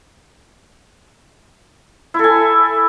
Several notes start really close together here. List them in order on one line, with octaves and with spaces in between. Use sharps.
E4 A4 G#5